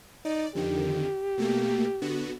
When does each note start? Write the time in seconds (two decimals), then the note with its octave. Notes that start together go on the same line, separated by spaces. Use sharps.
0.25 D#4 D5
0.55 F2 D3 D#3 G4
1.38 B2 A3 A#3
2.02 D3 B3 F#4